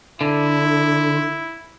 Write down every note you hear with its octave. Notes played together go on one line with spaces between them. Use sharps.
D3 E4